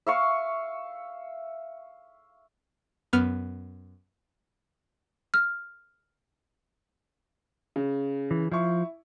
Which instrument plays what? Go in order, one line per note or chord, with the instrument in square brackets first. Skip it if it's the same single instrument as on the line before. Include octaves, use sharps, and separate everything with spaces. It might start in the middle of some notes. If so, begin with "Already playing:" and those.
[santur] E5 F5 C#6
[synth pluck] F#2 B3 F6
[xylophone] F6
[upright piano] C#3
[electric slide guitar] E3
[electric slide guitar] F3 [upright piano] E4 C#6